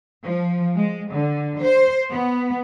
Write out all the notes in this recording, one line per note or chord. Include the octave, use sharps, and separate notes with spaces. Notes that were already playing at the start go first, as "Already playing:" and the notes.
F3
G#3
D3
C5
B3